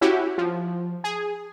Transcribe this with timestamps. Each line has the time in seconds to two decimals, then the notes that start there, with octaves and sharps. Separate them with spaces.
0.01 C#4 E4 F#4 G4
0.38 F3
1.04 G#4